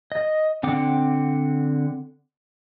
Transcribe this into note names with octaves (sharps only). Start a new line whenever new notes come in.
D#5
D3 C4 F#5 D6